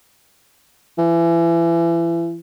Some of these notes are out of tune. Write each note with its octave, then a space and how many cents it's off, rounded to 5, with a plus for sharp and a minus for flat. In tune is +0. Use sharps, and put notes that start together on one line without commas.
E3 +30